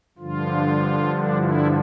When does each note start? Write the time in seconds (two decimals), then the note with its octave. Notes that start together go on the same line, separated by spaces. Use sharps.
0.18 G2 D3 F3 F4
1.07 D4
1.37 E4